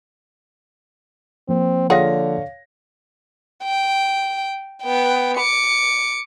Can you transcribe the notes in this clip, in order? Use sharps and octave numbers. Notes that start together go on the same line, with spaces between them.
F3 A#3 C4
D3 F4 G#4 C#5 F5 F#5 A#6
G5
B3 G5
D6 C#7